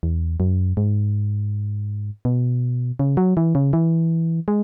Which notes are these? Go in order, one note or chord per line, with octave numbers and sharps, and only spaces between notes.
E2
F#2
G#2
B2
C#3
F#3
E3
C#3
E3
G#3